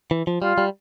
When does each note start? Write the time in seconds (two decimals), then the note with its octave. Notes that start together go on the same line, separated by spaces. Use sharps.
0.11 E3
0.27 F3
0.42 G3 F4
0.58 G3